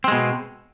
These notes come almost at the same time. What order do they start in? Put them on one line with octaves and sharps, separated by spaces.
C4 G#3 B2